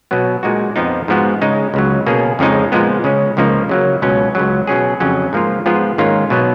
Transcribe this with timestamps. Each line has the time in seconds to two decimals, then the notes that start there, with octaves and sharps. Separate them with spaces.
0.11 B2 F#3 B3
0.43 A#2 G#3 D#4 F#4
0.76 F2 F3 B3 D#4
1.08 G#2 F3 B3 F#4
1.41 C#3 G#3 D#4
1.74 C#2 C#3 F#3
2.06 B2 A#3 C#4 G#4
2.39 F2 C#3 F3 G#3 D#4
2.72 A#2 F3 G#3 B3
3.04 C#3 G#3 C#4
3.37 C#2 C#3 F3 A#3 D#4
3.69 C#3 F#3 A#3
4.02 C#2 B2 F#3 C#4
4.35 C#2 C#3 F#3
4.67 B2 F#3 C#4 G#4
5.00 F2 C#3 F#3 C#4
5.33 G#2 F3 A#3 F4
5.66 G#2 F3 B3 F4 G#4
5.98 G#2 D#3 A#3 C#4 F4
6.30 B2 F#3 B3